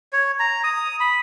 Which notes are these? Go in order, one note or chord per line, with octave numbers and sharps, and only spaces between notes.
C#5
A#5
D#6
B5